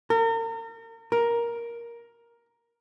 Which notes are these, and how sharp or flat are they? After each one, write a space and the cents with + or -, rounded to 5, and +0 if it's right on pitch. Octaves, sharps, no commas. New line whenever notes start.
A#4 -40
A#4 +10